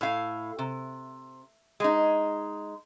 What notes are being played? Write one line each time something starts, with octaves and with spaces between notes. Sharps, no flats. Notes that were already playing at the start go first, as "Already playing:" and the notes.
A2 F5
C3
G#3 D#4